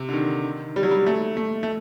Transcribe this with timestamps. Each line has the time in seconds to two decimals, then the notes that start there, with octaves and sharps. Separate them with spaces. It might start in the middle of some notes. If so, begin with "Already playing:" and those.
Already playing: C3
0.09 D3
0.13 D#3
0.76 G3
0.83 F#3
0.91 G3
1.06 A3
1.37 A3
1.63 A3